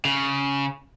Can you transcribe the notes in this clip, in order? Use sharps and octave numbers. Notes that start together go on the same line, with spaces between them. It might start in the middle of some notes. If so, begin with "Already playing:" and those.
C#3